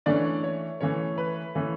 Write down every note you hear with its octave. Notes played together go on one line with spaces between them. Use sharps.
E3 A3 C#4 D4 D5
C#5
E3 A3 C#4 C#5
B4
E3 A3 C#4